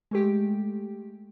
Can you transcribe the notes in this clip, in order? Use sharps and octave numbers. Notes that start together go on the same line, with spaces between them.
G#3 A3 G4